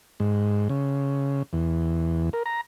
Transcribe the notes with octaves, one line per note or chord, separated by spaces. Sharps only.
G#2
C#3
E2
A#4
A#5